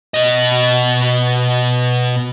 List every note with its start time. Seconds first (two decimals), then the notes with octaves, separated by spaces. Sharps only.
0.14 B2 D#5